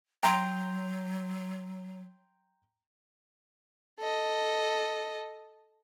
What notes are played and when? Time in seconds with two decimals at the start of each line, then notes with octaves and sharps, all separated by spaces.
0.23 F#3 G5 A#5 C6
4.00 A4 D#5